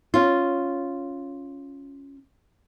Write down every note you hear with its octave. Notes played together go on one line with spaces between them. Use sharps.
C#4 F4